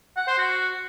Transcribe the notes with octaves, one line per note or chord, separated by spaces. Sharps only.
F#5
C5
F#4